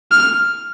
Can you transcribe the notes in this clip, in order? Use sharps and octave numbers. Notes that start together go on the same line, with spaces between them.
F6